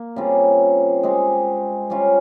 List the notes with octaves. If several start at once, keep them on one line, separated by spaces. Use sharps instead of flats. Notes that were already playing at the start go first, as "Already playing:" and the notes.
Already playing: A#3
C#3 G3 C4 F4
G#3 C4 G4
G3 C#4 F4